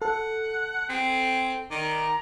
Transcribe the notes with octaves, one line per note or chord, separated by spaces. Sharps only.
A4 F#5
C4 G#4
D#3 D5 A#5